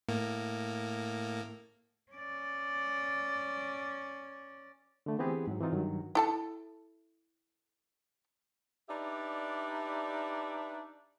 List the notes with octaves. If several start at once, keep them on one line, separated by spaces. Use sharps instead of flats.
A2 A#3
C#4 D5
D3 A3
E3 B3 C4 G4 G#4 B4
G#2 F#3
E3 C4 D#4 F4
G2 D#3 F#3
E4 A4 A5
D4 D#4 G4 B4 D5 E5